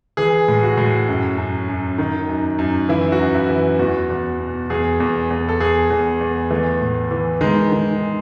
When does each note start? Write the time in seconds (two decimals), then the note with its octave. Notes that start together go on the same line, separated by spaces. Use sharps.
0.17 E3 G#4
0.48 A2
0.63 F#4
0.77 A2
1.08 F#2
1.38 F#2
1.69 F#2
1.98 D#3
2.29 F#2
2.59 F#2
2.89 E3 E4
3.12 F#4
3.20 F#2
3.34 E4
3.49 E3
3.79 E2 F#4
4.10 E2
4.40 B2
4.70 E2 G#4
5.00 E2
5.30 E2
5.49 A4
5.60 E2 G#4
5.90 E2
6.21 E2
6.51 E3 A3
6.81 A2
7.11 E3
7.41 D#3 G#3
7.72 D#3